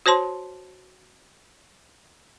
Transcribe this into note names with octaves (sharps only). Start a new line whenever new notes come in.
F#4 C5 C#5 A5 C6